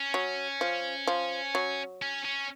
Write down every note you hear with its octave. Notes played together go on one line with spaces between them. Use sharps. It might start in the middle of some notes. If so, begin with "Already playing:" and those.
Already playing: C#4
F#3
F3
F3
F#3
C#4
C#4